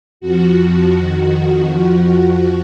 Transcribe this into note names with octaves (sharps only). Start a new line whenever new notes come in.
F2 F3 F#4
F2 D#3
F2 F3